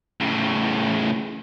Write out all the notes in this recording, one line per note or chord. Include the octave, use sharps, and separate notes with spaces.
A2 C#3